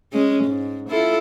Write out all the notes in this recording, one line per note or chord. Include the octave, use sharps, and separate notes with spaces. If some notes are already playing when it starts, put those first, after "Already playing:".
G#3 C#4
G#2
E4 F4 A4